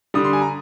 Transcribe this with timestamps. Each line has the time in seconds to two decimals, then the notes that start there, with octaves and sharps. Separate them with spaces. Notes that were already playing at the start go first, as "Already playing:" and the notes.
0.14 D3 G3 D#6
0.24 C6
0.33 G#5
0.42 A#5